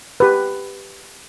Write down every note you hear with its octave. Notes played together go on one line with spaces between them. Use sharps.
G4 B4